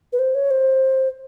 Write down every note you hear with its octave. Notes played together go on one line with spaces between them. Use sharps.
B4
C5
C#5
C5